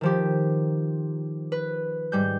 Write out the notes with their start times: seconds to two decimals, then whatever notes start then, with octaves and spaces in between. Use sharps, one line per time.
0.01 D#3 F3 G4
1.52 B4
2.12 G#2 G3 G6